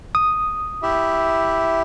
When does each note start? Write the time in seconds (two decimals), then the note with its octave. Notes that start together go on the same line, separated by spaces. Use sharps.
0.15 D#6
0.83 E4 G4 E5